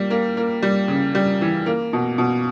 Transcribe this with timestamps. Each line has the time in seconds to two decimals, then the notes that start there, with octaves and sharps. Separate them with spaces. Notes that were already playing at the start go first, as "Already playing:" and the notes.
Already playing: G3 A#3
0.10 A#3
0.37 A#3
0.62 G3
0.88 C#3
1.15 G3
1.41 E3
1.66 A#3
1.93 B2
2.18 B2